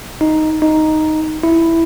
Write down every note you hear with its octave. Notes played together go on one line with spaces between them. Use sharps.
D#4
D#4
E4